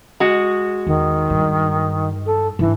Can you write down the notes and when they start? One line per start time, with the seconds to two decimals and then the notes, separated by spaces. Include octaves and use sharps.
0.20 G#3 F#4
0.87 E2 D#3
1.30 G2
2.26 A4
2.59 G#2 E3 D4